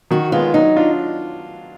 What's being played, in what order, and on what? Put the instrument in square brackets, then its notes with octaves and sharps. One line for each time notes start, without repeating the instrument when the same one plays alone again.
[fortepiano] D#3 [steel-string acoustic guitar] F#4
[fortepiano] G#3 B3 [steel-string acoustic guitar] F4
[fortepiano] F#3 [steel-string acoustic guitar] D#4
[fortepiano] D4 F4